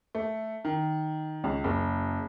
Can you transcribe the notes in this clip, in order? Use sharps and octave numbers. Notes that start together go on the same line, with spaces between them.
A3
D#3
C#2
F#1